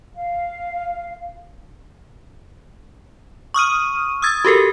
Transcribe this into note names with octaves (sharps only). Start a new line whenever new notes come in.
F5
C#6 D#6 F6 D#7
D#6 E6 G#6 A6
F#4 G4 A4 A#4